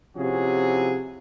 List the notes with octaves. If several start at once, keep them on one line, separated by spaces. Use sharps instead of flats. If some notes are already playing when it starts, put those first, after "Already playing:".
C3 F3 C#4 E4 F#4 G#4